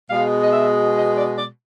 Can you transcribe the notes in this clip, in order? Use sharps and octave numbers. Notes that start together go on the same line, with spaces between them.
B2 G#3 F5
D#5
E5
D#5
D5
D5